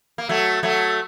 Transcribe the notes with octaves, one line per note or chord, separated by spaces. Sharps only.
A#3
F#3 A3
F#3 A3